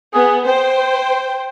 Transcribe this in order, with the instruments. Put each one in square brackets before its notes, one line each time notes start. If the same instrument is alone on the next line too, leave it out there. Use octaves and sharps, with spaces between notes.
[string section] B3 [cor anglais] G#4
[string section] C5 [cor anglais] G5